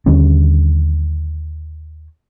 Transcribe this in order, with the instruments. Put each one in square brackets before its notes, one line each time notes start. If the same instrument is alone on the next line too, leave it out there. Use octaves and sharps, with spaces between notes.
[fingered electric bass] D#2 D3 G3 C#4